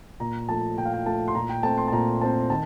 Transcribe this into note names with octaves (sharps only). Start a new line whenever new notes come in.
A#2 A#5
F3 A3 A5
A#2 G5
F5
G5
F3 A3 A5
C6
A#2 A#5
G5
A3 C4 A5
C6
A5
A#2 A#5
A3 C4 A5
D#3 A5